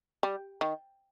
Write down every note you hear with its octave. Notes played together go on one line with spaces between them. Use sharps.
G3
D#3